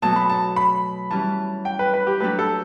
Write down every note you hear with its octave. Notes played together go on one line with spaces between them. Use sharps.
B2 F#3 A3 A5
B5
A5
B5
E3 G3 C#4 A5
G5
B4
B4
G4
F#3 A3 D4 G4 B4
A4